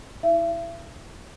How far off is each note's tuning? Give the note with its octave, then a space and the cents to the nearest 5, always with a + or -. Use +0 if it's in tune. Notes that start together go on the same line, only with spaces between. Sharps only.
E4 -20 E5 +40